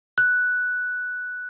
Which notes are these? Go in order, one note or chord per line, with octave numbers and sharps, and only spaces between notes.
F#6